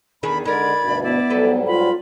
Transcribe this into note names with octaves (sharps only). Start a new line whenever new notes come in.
E2 D#3 D4 G#4 B5
D3 G#3 D#4 A#4 D5 B5 G#6
D2 G2 B2
B3 E4 D5
G#2 F#3 G3 A4 B4
F4 B5